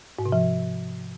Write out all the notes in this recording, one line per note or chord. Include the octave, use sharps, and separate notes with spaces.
G#2
C3
F3